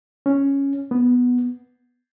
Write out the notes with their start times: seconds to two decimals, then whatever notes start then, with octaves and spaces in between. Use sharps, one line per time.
0.26 C#4
0.91 B3